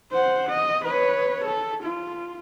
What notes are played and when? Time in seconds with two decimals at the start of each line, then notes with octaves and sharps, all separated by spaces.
0.12 C5 F#5
0.49 D#5
0.85 B4 C#5
1.45 A4
1.84 F4